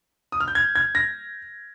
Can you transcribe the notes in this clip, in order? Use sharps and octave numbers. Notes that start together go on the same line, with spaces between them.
D#6
F6
G6
G#6
G#6
A#6